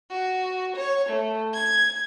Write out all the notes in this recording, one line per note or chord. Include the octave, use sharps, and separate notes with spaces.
F#4
C#5
A3
G#6